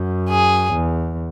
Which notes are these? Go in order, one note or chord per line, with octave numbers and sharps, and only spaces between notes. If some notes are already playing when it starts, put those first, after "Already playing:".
Already playing: F#2
G#4
E2